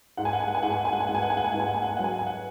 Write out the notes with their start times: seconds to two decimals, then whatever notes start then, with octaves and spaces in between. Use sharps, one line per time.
0.17 G#2 F#5
0.25 G#5
0.33 F#5
0.40 G#5
0.48 F#5
0.55 G#5
0.63 G#2 F#5
0.70 G#5
0.77 F#5
0.85 G#5
0.93 F#5
1.00 G#5
1.07 G#2 F#5
1.15 G#5
1.22 F#5
1.30 G#5
1.37 F#5
1.44 G#5
1.52 G#2 F#5
1.60 G#5
1.67 F#5
1.74 G#5
1.82 F#5
1.89 G#5
1.97 F#3 F#5
2.04 G#5
2.12 F#5
2.19 G#5
2.26 F#5